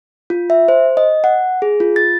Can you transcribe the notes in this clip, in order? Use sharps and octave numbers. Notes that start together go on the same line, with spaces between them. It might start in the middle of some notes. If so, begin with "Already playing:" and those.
F4
E5
C5
D#5
F#5
G#4
F4
A6